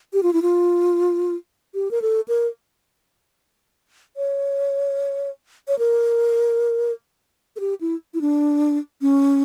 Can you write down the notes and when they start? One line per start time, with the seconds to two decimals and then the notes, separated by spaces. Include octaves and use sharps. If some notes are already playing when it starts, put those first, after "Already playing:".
0.13 G4
0.23 F4
0.33 E4
0.42 F4
1.74 G4
1.91 A#4
2.02 A4
2.28 A#4
4.17 C#5
5.68 C#5
5.79 A#4
7.56 A4
7.60 G4
7.81 E4
8.14 E4
8.21 D4
9.01 C#4